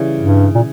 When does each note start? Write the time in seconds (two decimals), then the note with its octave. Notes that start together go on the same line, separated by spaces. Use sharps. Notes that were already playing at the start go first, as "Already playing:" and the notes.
Already playing: C#3 E3 G3
0.20 G2
0.55 A#2